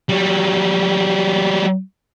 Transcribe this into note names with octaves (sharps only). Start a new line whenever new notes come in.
F#3 G3